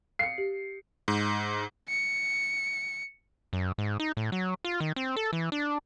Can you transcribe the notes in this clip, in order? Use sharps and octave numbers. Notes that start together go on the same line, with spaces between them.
F5 C7 C#7
G4
G#2
C#7
F#2
G#2
D#4
A2
F#3
F4
D#3
C4
A4
E3
D4